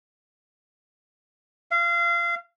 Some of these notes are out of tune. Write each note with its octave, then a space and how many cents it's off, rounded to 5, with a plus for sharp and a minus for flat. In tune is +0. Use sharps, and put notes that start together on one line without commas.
F5 -25